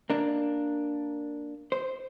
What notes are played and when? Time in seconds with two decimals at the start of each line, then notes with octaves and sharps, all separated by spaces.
0.10 A#3 D4
1.72 C5